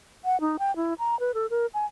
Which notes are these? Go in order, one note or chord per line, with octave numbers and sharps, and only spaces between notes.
F#5
D#4
G5
E4
A#5
B4
A4
A#4
G#5